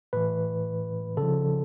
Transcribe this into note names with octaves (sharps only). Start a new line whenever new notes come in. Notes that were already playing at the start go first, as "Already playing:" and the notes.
A2 E3 B4
C#3 A4
F3